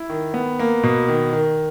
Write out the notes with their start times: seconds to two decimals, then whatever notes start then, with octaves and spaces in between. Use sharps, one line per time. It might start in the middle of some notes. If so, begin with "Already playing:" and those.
Already playing: E4
0.10 D#3
0.34 B3
0.59 A#3
0.83 B2
1.08 D#3
1.33 D#3